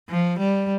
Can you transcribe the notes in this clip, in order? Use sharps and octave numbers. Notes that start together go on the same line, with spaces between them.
F3
G3